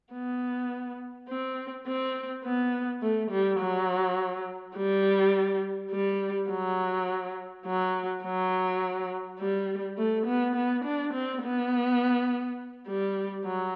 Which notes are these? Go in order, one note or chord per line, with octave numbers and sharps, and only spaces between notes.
B3
C4
C4
B3
A3
G3
F#3
G3
G3
F#3
F#3
F#3
G3
A3
B3
B3
D4
C4
B3
G3
F#3